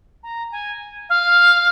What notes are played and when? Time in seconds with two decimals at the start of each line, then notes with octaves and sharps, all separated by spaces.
0.23 A#5
0.52 G#5
1.09 F5